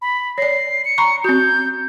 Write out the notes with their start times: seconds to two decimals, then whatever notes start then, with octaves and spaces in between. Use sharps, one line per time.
0.02 B5
0.38 C#5 D5 C7
0.85 C#7
0.98 A#5 B5 C#6
1.24 C4 F#4 G6